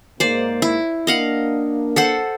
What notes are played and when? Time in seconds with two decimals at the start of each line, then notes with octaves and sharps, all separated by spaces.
0.20 G#2 A#3 C5 D5
0.62 E4
1.07 A#3 D4 D#5 F5 F#5
1.96 A4 C5 F#5